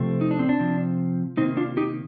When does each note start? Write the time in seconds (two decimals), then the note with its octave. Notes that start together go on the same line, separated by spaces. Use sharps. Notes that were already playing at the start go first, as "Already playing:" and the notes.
Already playing: C3 F3 A3 C4
0.21 D#4
0.31 D4
0.39 C4
0.49 D4
0.59 C3 F3 C4
1.37 C3 D#3 A#3 C4 D#4
1.57 D4 F4
1.77 D#4 G4